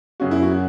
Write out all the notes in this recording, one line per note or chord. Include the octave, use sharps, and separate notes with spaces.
F#2 C#3 F#3 F#4
E4
F#4